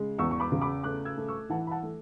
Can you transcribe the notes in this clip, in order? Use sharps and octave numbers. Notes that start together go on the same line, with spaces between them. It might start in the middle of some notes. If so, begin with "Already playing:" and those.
Already playing: C#3 G#3
E2 C#6 E6
C#6
B5 D6
C#3
B5 D6
A3 D6 F#6
E6 G#6
A3
C#6 E6
E3 F#5 A5
B5
F#5 A5
A3